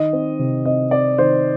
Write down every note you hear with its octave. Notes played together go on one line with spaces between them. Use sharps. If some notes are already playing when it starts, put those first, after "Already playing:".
Already playing: D#3 D#5
C4
C3
C4 D#5
C4 D5
D#3 C5